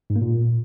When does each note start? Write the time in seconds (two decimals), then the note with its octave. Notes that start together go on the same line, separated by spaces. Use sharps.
0.10 G#2
0.16 A#3
0.22 A#2